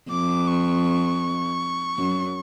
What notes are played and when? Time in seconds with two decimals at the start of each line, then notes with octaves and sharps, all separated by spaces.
0.10 F2 D6
0.48 C#6
1.98 F#2